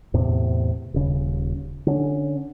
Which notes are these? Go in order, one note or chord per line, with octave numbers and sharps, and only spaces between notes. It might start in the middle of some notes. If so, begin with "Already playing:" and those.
E2 A2 C3
D#1 C#3
D3 C#4